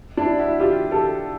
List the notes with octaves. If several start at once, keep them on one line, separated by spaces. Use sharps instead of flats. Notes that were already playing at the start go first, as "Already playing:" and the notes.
D4 E4
E4 F#4
F4 G4
G4 A4